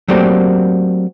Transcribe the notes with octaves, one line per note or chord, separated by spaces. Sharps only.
F#3 A3 A#3 C4 G4 D5